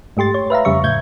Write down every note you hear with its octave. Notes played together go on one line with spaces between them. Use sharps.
G#2 A3 G4 C6 A6
C#5
B4 E5 F5 A#5
F2 C#3 G3 E5 C#6
A2 G6 G#6